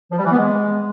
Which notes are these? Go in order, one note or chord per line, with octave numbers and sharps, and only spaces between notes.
F3
G3
E3
B3
G#3